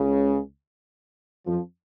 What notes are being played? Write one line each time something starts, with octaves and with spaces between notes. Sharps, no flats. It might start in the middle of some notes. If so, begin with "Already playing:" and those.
Already playing: C#2 C#3
F2 F3